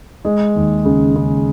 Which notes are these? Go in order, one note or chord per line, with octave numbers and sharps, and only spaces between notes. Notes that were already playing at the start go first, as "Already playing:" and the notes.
G#3
D#2
C#3
C#3